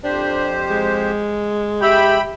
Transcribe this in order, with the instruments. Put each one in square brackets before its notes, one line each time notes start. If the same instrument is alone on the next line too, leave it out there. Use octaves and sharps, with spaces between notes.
[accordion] F2 G4 C5 [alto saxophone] D4
[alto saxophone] G#3
[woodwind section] G4 E5 [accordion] G5 B5